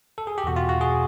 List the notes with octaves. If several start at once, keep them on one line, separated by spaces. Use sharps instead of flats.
A4
G#4
G4
E2 B2 F#4
F4
F#4
G#4